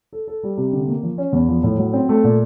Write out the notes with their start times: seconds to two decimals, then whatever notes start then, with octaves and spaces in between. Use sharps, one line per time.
0.13 A4
0.28 A4
0.43 G3
0.57 C3
0.72 D3
0.88 A#3
1.03 F3
1.18 C#4
1.33 E2
1.49 F3
1.63 A2
1.78 F#3
1.93 C4
2.09 A3
2.24 A#2